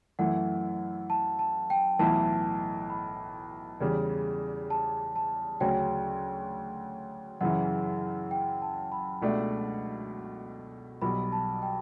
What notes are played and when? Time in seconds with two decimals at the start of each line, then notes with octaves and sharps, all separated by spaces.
0.19 F#2 E3 A3 E4 F#5
1.10 A5
1.39 A5
1.70 G5
1.99 B1 A2 E3 B3 E4 A5
2.90 B5
3.80 E2 C#3 G3
4.70 A5
5.16 A5
5.61 D2 C#3 F#3 C#4 F#4 G5
7.41 F#2 C#3 E3 F#5
8.31 G5
8.62 A5
8.92 B5
9.22 C#2 B2 A3 D4
11.02 B1 B2 G3 B5
11.32 A5
11.62 G5